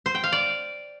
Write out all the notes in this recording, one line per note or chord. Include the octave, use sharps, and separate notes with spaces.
C5
G5
F5
D5